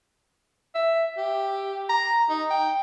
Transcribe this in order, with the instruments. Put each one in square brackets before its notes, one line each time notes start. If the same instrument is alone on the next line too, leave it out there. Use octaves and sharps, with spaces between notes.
[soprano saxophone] E5
G4
A#5
D#4
G5